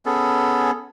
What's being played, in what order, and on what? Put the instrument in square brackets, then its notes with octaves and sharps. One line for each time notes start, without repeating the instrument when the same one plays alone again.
[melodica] B3 C#4 G#4 A4